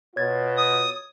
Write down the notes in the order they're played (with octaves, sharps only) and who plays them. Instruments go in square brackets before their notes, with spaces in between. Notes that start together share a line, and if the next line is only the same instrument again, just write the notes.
[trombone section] B2 F4 [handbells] C#5 G#6 A6
[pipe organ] D#6